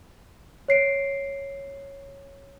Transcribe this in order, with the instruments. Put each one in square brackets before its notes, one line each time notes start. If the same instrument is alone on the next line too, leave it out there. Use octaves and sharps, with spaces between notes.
[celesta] C#5 C7 D7